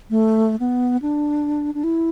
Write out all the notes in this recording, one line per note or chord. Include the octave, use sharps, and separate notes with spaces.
A3
B3
D4
D4
E4